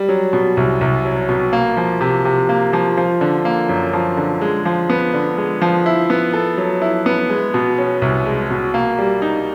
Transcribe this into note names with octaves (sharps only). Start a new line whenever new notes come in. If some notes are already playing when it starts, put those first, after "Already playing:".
Already playing: G3
F#3
B2
C2
C2
F#3
B2
A#3
F3
C3
C3
A#3
F3
F3
D3
A#3
F#2
F3
D3
G#3
F3
B3
D3
G#3
F3
E4
B3
A4
F#3
E4
B3
G#3
B2
C#4
C2
G#3
B2
A#3
G3
D#4